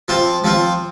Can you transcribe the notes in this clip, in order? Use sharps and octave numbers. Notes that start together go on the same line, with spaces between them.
F3 C4 F4
F3 C4 F4